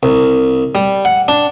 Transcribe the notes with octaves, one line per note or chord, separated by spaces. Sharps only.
C2
G3
F#5
D4